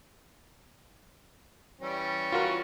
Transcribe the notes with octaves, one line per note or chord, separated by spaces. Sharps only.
E3 G3 C#4
F4 F#4 A#4